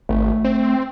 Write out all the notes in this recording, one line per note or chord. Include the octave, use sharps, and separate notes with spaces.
G#1 A3
C4